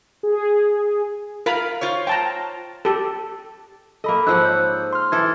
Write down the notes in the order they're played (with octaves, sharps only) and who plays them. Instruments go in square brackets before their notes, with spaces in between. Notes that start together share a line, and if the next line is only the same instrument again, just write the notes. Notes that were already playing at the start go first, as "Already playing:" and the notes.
[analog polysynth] G#4
[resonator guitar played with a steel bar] F4 F5 [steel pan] A#4 B5
[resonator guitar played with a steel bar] F4 C5 C#5
[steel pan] G5 A5 A#5
G4 A4
[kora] A#3 D#5 [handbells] A4 B5
[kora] G#2 F3 F#5 [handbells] E6 F#6
[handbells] C#5 G6
C6 F6
[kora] E3 A4 [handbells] G#6